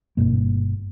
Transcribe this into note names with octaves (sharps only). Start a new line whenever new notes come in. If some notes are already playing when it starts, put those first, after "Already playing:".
G1 G2 B2 A#3